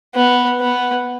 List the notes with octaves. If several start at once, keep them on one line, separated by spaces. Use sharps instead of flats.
B3
B3